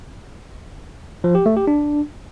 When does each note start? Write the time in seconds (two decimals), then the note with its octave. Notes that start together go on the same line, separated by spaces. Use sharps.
1.24 F3
1.35 G4
1.46 A3
1.57 G4
1.67 D4